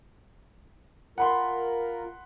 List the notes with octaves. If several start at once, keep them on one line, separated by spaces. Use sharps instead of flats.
F4 A#4 F#5 B5 C6